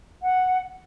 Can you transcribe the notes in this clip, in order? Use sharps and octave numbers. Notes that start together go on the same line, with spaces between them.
F#5